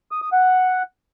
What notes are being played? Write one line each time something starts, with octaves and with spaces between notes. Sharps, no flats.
D#6
D#6
F#5